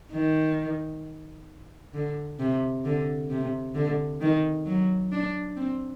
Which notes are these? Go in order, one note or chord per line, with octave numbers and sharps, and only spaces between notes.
D#3
D3
C3
D3
C3
D3
D#3
F#3
D4
C4